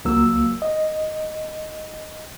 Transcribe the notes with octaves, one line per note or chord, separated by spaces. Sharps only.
C#2 F#3 A#3 E6
D#5